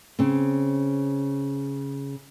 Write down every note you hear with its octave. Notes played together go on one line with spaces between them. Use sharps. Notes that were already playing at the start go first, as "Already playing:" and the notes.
C#3 C4